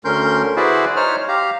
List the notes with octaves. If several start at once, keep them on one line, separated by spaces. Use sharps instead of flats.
D2 D3 C#4 A#4 C6 G6
E4 F#4 G#4 B4 C5 D5
D#4 C5 C#5 F6
G4 F5 A#5